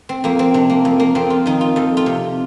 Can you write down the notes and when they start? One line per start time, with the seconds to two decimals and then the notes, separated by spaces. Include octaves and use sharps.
0.09 C4
0.24 F2 A#3
0.39 C4
0.54 C3 D4
0.70 A#3
0.85 F2
1.00 A#3
1.15 F2 C4
1.30 F4
1.46 D#3 D#4
1.61 F4
1.76 F2 A4
1.97 F4
2.06 C3